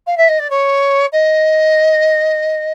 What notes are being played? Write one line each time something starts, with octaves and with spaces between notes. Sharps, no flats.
F5
E5
D#5
D5
C#5
D#5